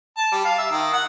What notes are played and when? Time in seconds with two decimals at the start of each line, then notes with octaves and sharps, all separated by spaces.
0.17 A5
0.32 G3
0.45 F5
0.58 E5
0.71 D#3
0.93 F#5